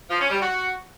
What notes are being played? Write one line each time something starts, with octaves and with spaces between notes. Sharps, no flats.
F3
C#4
G3
F#4